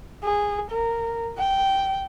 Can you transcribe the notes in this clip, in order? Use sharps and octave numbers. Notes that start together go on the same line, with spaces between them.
G#4
A#4
G5